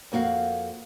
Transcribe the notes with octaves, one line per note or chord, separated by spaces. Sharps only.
F2 A#3 F#4 F5